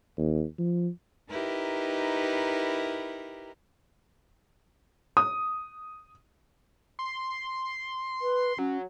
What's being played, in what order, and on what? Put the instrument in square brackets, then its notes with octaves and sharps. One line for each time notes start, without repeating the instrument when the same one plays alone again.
[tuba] D#2
F3
[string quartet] D#4 E4 G4 A#4 B4
[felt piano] D#6
[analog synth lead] C6
[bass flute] B4 [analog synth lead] C6
[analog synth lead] F#3 [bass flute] C#4